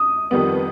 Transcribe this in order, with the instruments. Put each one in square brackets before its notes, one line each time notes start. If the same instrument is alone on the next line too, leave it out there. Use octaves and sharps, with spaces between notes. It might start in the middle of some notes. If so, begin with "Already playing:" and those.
Already playing: [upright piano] D#6
[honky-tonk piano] F2 D#3 G3 B3